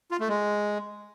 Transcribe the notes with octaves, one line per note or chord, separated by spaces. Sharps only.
F4
A3
G#3